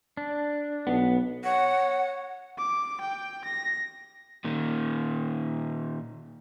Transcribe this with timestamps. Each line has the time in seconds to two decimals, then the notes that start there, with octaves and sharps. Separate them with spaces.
0.17 D4
0.87 B1 B3
1.44 C#5 F#5
2.58 D6
3.01 G5
3.45 A#6
4.44 A#2 D#3